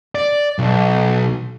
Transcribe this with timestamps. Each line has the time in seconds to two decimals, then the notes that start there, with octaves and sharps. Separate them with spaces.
0.15 D5
0.59 B1